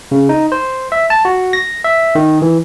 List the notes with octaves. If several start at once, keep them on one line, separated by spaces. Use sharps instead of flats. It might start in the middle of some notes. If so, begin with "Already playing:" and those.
C#3
D#4
C5
E5
A5
F#4
A#6
E5
D#3
E3